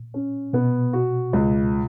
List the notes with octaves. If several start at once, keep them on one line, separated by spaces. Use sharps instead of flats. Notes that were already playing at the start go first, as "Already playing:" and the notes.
Already playing: A#2
C#4
B2 B3
F#4
C#2